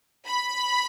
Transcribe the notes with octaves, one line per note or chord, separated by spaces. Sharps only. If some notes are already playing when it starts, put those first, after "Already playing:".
B5